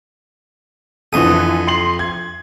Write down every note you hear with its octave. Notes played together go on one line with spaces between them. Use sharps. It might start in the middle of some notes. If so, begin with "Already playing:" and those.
F2 D3 E3 A4 D#6
C6 C7 F#7
G#6